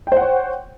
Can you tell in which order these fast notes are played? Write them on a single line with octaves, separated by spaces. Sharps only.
G5 C5 F#5 C#5